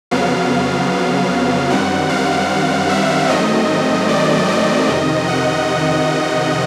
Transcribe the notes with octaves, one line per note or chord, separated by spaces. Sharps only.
F2 C#3 F#3 B3 F5
F#2 D#3 G3 C4 F#5
F5
E5
G#2 D#3 F#3 A3 C4 D#5
D5
D#5
F2 C3 D#3
F#5